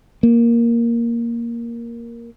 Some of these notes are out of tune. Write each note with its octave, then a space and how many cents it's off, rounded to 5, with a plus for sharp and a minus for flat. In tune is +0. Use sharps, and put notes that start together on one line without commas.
A#3 +5